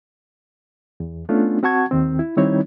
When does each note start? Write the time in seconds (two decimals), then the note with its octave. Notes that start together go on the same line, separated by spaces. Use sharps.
1.00 E2
1.29 A3 B3 C#4 D4 F4
1.63 C4 F#4 F#5 A5 C#6 G#6
1.91 D#2 D#3 C4
2.19 E4
2.37 D#3 G3 C4 D#4 E4 C#5